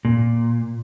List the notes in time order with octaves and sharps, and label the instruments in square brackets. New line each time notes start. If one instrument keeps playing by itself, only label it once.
[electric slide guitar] A#2